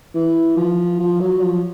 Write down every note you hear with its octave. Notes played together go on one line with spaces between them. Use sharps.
E3
F3
F3
F#3
F3